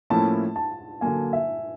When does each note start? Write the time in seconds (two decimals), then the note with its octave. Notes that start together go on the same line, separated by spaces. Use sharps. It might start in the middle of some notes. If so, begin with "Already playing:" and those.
0.10 A2 F3 A#3 C#4 E4 A5
0.56 A5
1.01 D3 F#3 A#3 G#5
1.33 E5